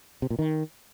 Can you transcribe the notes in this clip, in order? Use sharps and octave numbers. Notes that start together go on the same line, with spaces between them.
C3
A#2
D#3